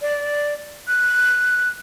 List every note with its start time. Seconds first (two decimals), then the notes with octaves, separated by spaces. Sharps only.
0.02 D5
0.88 F#6